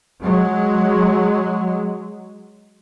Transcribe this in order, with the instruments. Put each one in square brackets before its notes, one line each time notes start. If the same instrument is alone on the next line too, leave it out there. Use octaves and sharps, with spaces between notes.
[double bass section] F#3 G#3